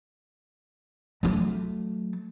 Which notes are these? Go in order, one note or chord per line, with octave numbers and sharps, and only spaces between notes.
F#3 A3